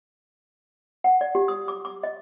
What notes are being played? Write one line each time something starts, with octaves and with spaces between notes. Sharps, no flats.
F#5
D5
G4
D#6
D6
D6
D#5